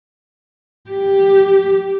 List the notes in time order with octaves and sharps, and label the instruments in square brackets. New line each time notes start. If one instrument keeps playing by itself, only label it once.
[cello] G4